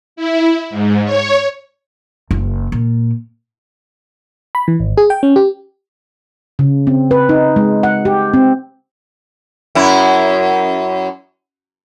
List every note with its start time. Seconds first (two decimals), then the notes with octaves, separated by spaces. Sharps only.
0.16 E4
0.70 G#2
1.05 C#5
2.31 F#1
2.72 A#2
4.55 B5
4.68 E3
4.80 G#1
4.97 G#4
5.10 G5
5.23 C#4
5.36 G4
6.59 C#3
6.87 C4
7.11 B4
7.29 D#4
7.56 G#3
7.83 F#5
8.05 G4
8.34 C4
9.75 F#2 E4